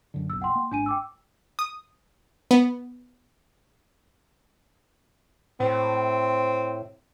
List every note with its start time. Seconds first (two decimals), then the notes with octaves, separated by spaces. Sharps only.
0.14 F#2 D3
0.30 F#1 B1 E6
0.42 F#5 G5 C6
0.55 A#3
0.71 G#1 D4 G#5 D#7
0.86 G5 D6 E6
1.59 D#6
2.51 B3
5.60 A2 C4